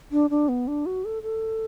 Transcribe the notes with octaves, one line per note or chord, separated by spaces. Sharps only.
D4
D4
B3
D4
F#4
A4
A4